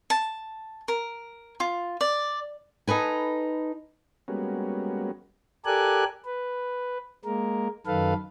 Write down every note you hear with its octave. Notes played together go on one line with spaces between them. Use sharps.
A5
A#4
F4
D5
D#4 A4 B4 G#5
G3 G#3 A#3 B3 C#4 F#4
G4 A4 A#4 D5 G#5 F#6
B4
G#3 A#3 A#4
F#2 D#3 A4 B4 F5